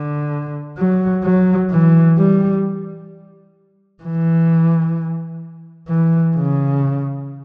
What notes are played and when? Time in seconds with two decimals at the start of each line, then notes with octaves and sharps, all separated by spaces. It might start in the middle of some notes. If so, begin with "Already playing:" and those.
Already playing: D3
0.78 F#3
1.24 F#3
1.71 E3
2.18 G3
4.03 E3
5.88 E3
6.36 C#3